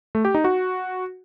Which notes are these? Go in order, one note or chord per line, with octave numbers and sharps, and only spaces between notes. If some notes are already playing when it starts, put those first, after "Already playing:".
A3
G4
D#4
F#4